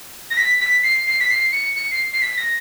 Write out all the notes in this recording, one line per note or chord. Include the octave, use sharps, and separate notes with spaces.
A#6
B6
B6
C7
C7
B6
C7
C#7
C#7
C7
C7
B6
A#6